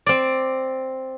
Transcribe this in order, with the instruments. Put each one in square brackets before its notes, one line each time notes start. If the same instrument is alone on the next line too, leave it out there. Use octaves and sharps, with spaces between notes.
[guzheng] C4 D5